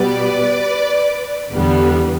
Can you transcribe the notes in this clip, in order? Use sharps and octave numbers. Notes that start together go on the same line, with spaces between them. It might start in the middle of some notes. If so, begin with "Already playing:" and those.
Already playing: B2 G3 B3 B4 D5
E2 D3 G3 B3